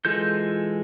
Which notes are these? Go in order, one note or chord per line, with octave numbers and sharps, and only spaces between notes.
E3 G#3 F4 A4 G6